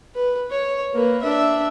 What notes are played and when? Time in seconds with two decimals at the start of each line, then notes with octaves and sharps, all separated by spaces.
0.15 B4
0.51 C#5
0.94 A#3 B4
1.22 D4 E5